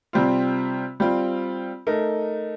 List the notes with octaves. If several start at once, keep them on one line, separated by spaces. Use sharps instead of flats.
C3 G3 C4 F4
G3 C4 F4
A3 D#4 A#4